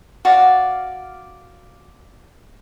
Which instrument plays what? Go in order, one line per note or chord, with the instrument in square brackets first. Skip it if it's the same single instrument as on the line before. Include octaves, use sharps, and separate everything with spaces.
[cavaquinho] F#4 D5 F5